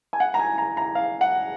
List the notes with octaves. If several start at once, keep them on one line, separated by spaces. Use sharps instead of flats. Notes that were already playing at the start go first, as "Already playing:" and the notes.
G#5
F#5
A#5
G#5
A#5
A#5
F5
F#5